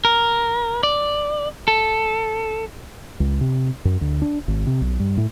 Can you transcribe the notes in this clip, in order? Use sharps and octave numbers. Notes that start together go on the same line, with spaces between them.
A#4
D5
A4
C#2
C3
F#2
D2
D4
G#1
C3
B1
G2
A2